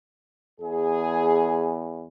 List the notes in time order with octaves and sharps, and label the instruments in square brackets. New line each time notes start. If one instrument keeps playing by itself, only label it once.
[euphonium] E2 [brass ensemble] G#4